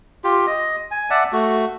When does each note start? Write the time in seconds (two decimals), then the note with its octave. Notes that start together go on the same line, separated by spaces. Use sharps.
0.24 F4 G4
0.47 D#5
0.91 G#5
1.10 D5 E5 F#5 A5
1.32 A3 F#4